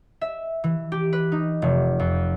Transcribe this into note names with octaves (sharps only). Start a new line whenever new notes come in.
E5
E3
G4
B4
D#4
F1
F2